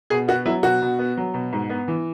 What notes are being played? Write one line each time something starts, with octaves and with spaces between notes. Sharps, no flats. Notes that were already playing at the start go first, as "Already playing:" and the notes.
B2 G#4
B3 F#4
F#3 E4
B2 F#4
B2
B3
F#3
B2
G#2
B3
E3